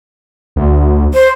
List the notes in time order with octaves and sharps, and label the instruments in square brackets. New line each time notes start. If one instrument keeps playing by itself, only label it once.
[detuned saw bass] D2
[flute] C5